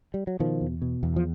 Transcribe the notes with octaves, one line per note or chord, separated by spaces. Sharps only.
G3
F#3
B2 D#3 F3
E2
B2
E2
F3